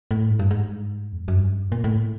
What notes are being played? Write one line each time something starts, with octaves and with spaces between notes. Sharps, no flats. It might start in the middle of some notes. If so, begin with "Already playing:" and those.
A2
G#2
G2
G#2
E2
F2
F#2
G2
A#2
A2